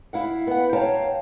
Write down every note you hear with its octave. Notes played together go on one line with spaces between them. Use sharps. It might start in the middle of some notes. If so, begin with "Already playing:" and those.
E4 F5 F#5
B3 F#5
C#5 F5 G5 A5 A#5